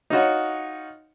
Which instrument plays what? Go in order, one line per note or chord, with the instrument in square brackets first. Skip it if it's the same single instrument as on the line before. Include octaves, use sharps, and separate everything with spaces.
[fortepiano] D#4 F4 F#4 C#5